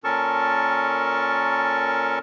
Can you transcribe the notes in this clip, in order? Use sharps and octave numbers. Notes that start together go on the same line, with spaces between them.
A#2 C#4 A4 A#4 A5 C#6